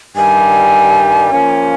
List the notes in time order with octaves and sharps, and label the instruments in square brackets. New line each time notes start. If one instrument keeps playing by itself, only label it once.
[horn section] G2 D#3 G3 [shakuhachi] G#5
[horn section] F3 A#3 C#4